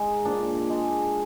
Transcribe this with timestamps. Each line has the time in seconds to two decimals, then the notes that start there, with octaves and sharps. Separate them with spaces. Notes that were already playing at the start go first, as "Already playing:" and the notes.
Already playing: G#3 D#4
0.25 A#2 D4
0.69 G#3